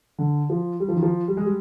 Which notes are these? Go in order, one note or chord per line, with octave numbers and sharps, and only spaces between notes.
D3
F3
G3
F3
D#3
F3
G3
G#3
G3